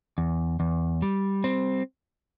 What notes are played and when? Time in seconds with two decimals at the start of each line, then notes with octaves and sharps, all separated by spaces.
0.18 E2
0.60 E2
1.02 G3
1.44 C4